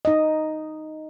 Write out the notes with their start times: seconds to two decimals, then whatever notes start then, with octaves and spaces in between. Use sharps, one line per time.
0.05 D#4 D#5